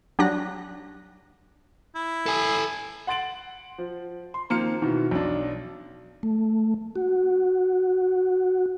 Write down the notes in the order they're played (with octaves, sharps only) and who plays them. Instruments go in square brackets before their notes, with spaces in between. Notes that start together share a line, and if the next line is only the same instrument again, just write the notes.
[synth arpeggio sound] F#3 G3 D4 D5 F#6 A#6
[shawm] E4
[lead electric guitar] A4 G#5
[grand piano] F#5 C6 A6 D7 F#7
F3
C6
D#3 F3 A#3 C4 F6 C#7
B2 D#3 E3
B1 D4
[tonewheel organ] A3
F#4